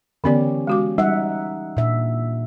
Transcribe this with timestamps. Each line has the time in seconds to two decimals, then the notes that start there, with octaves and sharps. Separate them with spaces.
0.24 D3 E3 B3 C#4 G4 D5
0.67 G#3 F#4 D6
0.98 G3 D#4 E5 F#5
1.77 A#2 D4 E5